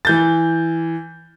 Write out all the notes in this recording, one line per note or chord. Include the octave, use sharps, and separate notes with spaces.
E3 G6 A6